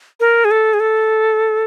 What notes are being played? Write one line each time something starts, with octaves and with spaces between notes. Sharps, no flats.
A#4
G#4
A4
G#4
A4